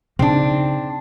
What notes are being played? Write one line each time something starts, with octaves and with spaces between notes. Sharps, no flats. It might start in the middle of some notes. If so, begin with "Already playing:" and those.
C#3 C4 D4 D#4